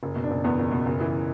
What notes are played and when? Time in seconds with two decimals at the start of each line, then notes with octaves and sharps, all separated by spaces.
0.03 F#1
0.16 B2
0.24 D4
0.31 F#1
0.44 E2 B3
0.59 F#1
0.72 B2
0.86 F#1
1.01 E3